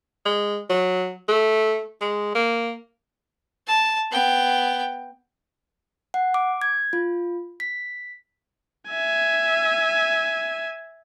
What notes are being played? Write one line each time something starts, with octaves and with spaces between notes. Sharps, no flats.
G#3
F#3
A3
G#3
A#3
A5
B3 G5
F#5
D6
G#6
F4
B6
E5 G#5